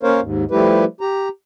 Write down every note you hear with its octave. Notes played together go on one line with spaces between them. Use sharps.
A#3 C#4 A#4 C5 C#5 F5
D#2 G#2
F3 G3 A3 E4 G4 B4
G4 A#5